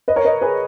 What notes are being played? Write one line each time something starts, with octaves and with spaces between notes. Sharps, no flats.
B4 D#5
A#4 C#5
B4 D#5
G#4 B4